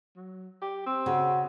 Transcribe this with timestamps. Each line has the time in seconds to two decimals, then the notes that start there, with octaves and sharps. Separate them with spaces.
0.16 F#3
0.62 G4
0.86 C4
1.06 C#3 F#4